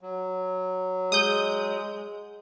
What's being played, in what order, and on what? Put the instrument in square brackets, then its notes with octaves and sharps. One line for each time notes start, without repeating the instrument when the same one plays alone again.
[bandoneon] F#3
[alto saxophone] G#3 [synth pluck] D#6 G6